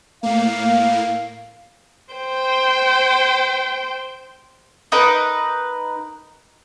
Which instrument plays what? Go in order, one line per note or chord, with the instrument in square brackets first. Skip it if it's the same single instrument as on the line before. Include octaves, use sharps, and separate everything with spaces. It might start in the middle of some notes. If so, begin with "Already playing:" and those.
[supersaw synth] A2 A#3 [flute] F5
[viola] C5 G5
[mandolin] D#4 A#4 B4